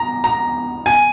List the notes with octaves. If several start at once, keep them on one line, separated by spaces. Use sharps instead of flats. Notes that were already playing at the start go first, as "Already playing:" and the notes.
Already playing: A#5
A#5
G#5